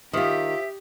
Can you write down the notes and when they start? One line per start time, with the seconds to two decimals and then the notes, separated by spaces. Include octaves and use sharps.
0.13 D#3 F4 G4 C5 E5